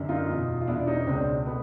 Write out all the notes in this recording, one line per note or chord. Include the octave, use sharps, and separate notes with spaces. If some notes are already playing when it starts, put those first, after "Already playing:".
Already playing: F#2 D3
D#4 F4
E2 B2
F4
E2 B2 D4 E4
C#4 D#4
C#2 B2 C4 D4
B2 A3 B3